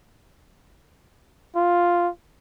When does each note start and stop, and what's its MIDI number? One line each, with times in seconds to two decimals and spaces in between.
1.56 2.09 65